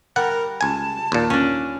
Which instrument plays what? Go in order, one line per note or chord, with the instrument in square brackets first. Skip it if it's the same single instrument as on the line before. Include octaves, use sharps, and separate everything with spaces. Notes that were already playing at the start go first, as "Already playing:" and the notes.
[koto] G3 [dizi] A#4 [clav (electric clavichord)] F#5
[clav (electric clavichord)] C#2 G#5 [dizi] A5
[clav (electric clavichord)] D#2 A#2
[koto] C#4 D4